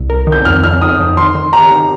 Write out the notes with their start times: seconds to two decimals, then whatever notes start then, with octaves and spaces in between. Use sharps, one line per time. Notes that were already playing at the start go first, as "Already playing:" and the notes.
Already playing: C2
0.10 A#4
0.27 D#3
0.32 G6
0.45 F2 F6
0.63 F2 F6
0.81 D#4 D#6
0.99 F2
1.17 D#3 C6
1.35 D#3
1.53 G4 A#5
1.71 D#3